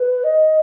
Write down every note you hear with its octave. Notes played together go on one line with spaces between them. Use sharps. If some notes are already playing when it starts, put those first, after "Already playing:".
Already playing: B4
D#5